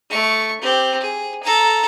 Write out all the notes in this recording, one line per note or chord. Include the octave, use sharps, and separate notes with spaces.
A3 C#6
C4 G4
G#4
A4 A#5